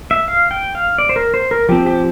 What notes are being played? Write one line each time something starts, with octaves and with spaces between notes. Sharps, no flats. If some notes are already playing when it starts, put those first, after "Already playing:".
E5
F5
G5
F5
D5
C5
A#4
C5
A#4
F3 C4 G4
G4